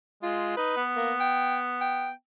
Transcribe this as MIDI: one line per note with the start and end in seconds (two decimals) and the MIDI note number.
0.23 0.56 56
0.23 0.54 65
0.57 0.74 63
0.57 0.83 71
0.76 2.11 59
0.97 1.12 58
1.20 1.58 79
1.81 2.11 79